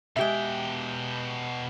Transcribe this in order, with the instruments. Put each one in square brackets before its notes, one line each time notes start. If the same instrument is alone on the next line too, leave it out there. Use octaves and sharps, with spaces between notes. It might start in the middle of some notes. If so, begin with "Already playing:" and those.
[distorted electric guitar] B2 G5 [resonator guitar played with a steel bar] G#3 G4 E5